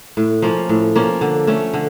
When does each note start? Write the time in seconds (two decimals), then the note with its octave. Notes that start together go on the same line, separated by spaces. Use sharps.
0.17 A2
0.42 F3 A#3 C#4
0.69 A2
0.95 F3 A#3 C#4
1.21 D3
1.47 A3 C#4
1.74 D3